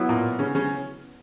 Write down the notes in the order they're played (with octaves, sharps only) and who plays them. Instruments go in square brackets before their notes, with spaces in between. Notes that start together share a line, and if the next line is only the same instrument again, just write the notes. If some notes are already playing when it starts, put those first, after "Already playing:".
Already playing: [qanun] F#3 B3 E4
[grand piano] A#2 A#3
C#3 C#4
C#3 C#4